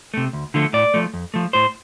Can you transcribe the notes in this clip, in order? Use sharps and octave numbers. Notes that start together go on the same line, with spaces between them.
C3 A3
D2
D3 F3 A3
A2 D5
F3 A3
F2
F3 A3
A2 C5